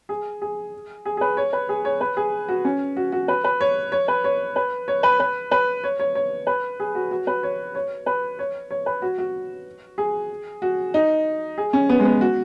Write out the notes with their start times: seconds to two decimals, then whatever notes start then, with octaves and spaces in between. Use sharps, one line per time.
0.09 G#4
0.42 G#4
1.05 G#4
1.17 G#4
1.21 B4
1.37 C#5
1.53 B4
1.69 G#4
1.85 C#5
2.01 B4
2.17 G#4
2.48 F#4
2.65 C#4
2.96 F#4
3.12 F#4
3.28 B4
3.44 B4
3.61 C#5
3.92 C#5
4.08 B4
4.24 C#5
4.56 B4
4.88 C#5
5.03 B4
5.20 B4
5.51 B4
5.84 C#5
6.00 C#5
6.15 C#5
6.47 B4
6.80 G#4
6.95 F#4
7.11 F#4
7.27 B4
7.43 C#5
7.75 C#5
8.06 B4
8.39 C#5
8.71 C#5
8.86 B4
9.02 F#4
9.18 F#4
9.98 G#4
10.62 F#4
10.94 D#4
11.58 G#4
11.73 C#4
11.89 B3
12.00 G#3
12.05 B3
12.21 F#4